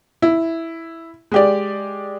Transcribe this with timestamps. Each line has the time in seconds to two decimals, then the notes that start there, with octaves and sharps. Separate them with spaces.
0.22 E4
1.32 G#3 G4 D5